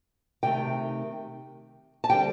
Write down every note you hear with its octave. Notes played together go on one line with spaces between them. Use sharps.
C3 D#3 A3 G5
A5
D3 G3 C4 G5